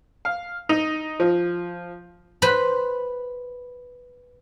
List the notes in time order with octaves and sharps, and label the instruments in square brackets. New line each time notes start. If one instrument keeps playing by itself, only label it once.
[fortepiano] F5
D#4
F3
[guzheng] B4 C5 B5 C6